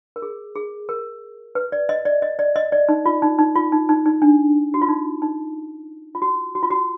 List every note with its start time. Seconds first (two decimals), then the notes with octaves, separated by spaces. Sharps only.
0.16 A#4
0.22 G#4
0.55 G#4
0.89 A#4
1.55 B4
1.72 D5
1.89 D#5
2.05 D5
2.22 D#5
2.39 D5
2.56 D#5
2.72 D5
2.89 D#4
3.06 F4
3.22 D#4
3.39 D#4
3.56 F4
3.72 D#4
3.89 D#4
4.06 D#4
4.22 D4
4.74 F#4
4.82 F4
4.89 D#4
5.22 D#4
6.15 F4
6.22 F#4
6.55 F#4
6.63 F4
6.71 F#4